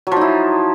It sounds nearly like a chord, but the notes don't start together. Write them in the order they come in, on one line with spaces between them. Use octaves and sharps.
F#3 F3 D#4 E4